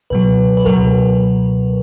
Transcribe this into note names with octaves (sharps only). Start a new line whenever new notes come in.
C#2 B2 F#3 B4
B4
C#2 B2 F#3 A#4